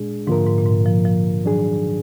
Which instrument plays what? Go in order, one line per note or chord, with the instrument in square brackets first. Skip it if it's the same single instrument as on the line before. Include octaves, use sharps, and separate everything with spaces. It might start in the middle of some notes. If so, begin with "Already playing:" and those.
Already playing: [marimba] A#2 [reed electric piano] G#3 D4 G#4
[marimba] G#2 [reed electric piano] D3 F3 A#3 F4 A#4
[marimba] G#2
A#2
G#2
F3
F3
[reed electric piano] D#3 F#3 D4 G#4